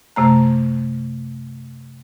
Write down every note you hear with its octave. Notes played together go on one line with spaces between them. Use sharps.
F#2 C3 A3 A#5